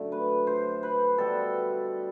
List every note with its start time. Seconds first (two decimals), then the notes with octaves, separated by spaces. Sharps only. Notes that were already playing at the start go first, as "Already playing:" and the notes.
Already playing: F#2 D3 A3
0.12 B4
0.47 C5
0.83 B4
1.18 B2 G3 A4